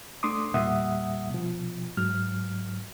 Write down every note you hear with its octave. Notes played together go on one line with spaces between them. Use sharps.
A3 D4 C6 D6 D#6
E2 A#2 G3 E5 F#5 D#6
B2 F3
G#2 F#3 F6